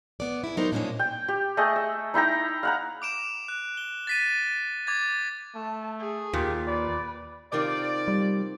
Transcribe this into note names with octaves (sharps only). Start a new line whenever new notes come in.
B3 D5
E4 G#4
F#3 B3 D#4 G4 A#4 C5
G2 A#2 G#3 C#4 D4 D#5
G5
G4
A3 G#4 D#5
E5
D#4 E4 G5 A#5
F5 F#5 A#5
D6 D7 E7
F#6
G7
A6 B6 D#7
D6 G#6 A6
A3 A5
G#4
D#2 A#2 G4
B4 D5
C3 D#3 F4 D5
G3